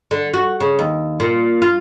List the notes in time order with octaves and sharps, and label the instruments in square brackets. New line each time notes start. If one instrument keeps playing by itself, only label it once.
[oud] D3
F#4
C#3
D#2
A#2
F4